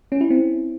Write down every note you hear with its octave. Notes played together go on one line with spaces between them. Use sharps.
C#4
E4
C4